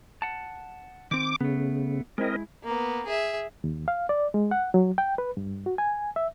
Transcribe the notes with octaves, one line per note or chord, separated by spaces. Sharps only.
F#5 A5
D#3 C4 D6
C#3 A3 B3
G#3 C4 E4 A#4 D#5
A#3 B3
G#4 E5
D#2
F5
D5
G#3
F#5
F#3
G5
B4
G2
F#4
G#5
E5